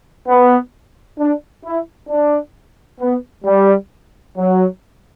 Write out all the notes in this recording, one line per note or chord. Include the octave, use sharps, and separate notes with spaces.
B3
D4
E4
D4
B3
G3
F#3